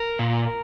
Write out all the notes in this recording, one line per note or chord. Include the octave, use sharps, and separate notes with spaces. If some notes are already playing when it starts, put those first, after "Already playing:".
Already playing: A#4
A#2